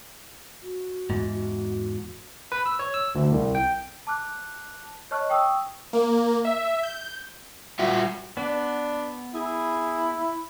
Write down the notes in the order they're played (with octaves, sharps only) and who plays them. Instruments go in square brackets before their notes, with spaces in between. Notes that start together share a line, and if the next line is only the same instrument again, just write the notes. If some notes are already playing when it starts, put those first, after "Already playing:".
[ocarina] F#4
[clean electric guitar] E2 G#2
[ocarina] F#4
[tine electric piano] B4
E6
C#5
E6
D2
C2
G5
[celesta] A5 D6 F6 F#6
C#5 D#5 A5 C#6 F6 F#6
G5 C#6 D#6 E6
[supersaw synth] A#3
E5
G6
[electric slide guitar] G3 F4 E5 [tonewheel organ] F#4
[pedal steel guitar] B3 [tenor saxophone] D4
[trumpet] E4 [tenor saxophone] G#4